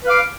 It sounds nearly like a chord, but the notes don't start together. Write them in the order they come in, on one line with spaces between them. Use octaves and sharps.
B4 F5 D6